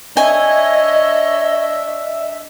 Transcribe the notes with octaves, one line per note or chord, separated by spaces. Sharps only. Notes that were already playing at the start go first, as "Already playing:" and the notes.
D4 C#5 D#5 E5 G#5